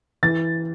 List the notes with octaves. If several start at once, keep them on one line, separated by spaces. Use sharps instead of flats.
E3 A6